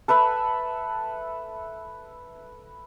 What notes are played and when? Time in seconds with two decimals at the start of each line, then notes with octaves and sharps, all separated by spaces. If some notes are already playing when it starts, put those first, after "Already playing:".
0.08 A4 B4 E5 B5